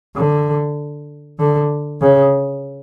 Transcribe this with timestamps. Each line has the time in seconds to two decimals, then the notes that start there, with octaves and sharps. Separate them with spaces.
0.16 D3
1.39 D3
2.01 C#3